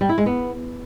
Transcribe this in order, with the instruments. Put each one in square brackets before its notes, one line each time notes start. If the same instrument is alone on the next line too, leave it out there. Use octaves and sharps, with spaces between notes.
[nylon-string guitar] G3
E4
G#3
B3